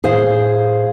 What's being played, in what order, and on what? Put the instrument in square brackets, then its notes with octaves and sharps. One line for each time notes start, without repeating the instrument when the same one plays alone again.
[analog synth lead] A2 [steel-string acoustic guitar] G#4 C5 F5